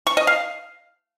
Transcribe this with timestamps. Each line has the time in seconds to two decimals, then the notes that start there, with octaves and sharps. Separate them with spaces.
0.07 C#6
0.17 D#5
0.27 F5